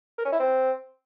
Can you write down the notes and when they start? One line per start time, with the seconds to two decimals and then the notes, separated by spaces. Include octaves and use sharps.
0.18 A#4
0.25 C#4
0.32 E4
0.39 C4